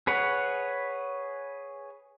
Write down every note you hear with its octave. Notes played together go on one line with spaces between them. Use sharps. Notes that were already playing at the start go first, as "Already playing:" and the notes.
G#4 B4 C#5 F#5